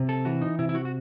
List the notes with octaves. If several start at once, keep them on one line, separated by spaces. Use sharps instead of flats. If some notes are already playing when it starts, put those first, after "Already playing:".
Already playing: C3
A4
E3 F#4
D#4
C3 E4
E4
F#4
F#4